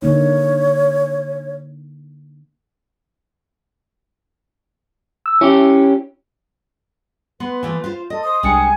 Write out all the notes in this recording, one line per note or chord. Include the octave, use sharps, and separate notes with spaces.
D3 A#3 D#4 C#5
E6
C#4 E4 G4
B3 B4 C6
E3 F3 A3
F4 C5 F5
A4 D#5
C5 D#6
C2 G#3 C4 D4 G#5 C#7